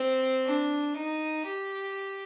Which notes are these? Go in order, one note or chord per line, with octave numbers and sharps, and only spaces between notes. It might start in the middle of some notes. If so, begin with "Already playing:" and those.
Already playing: C4
D4
D#4
G4